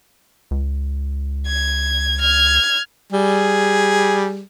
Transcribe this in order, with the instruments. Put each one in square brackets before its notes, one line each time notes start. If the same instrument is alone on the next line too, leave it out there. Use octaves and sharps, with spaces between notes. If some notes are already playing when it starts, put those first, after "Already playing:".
[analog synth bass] C#2
[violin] G#6
F6 G#6
[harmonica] G3 G#4